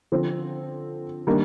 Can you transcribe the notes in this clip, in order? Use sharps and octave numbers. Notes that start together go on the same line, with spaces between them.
D3 F3 C4
D#3 G3 A#3 D4